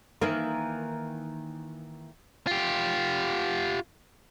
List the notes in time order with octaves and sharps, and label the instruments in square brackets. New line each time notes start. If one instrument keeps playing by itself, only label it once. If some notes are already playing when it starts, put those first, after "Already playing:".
[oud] D#3 E3 A#3
[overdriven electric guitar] F4 G4